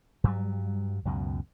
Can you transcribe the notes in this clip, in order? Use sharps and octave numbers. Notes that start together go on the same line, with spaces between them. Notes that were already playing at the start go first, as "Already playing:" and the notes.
G2 F#3 G3
C#2 F#2 B2